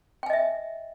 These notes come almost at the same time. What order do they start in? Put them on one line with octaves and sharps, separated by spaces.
G5 G#5 D#5 E5